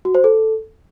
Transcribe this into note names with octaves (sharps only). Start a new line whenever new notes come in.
F#4
C5
A4